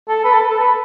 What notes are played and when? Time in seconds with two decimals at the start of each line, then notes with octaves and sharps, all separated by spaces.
0.08 A4
0.25 B4
0.33 A4
0.50 A4
0.59 B4